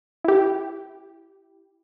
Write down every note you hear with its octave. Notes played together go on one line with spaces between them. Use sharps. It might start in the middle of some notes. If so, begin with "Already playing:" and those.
E4 G4